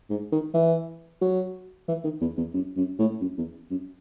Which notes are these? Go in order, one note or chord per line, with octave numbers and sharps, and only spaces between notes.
G#2
D#3
E3
F#3
E3
D#3
E2
E2
F#2
F#2
A2
F#2
E2
F#2